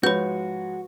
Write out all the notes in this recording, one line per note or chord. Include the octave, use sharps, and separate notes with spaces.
G#2 F3 G#3 F#4 B4 C#5 B5 G6